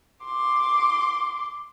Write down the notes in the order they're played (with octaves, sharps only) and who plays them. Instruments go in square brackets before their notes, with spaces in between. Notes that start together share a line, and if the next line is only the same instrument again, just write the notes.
[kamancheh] C6 D6